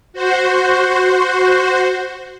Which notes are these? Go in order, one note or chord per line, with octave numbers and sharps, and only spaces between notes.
F#4 C5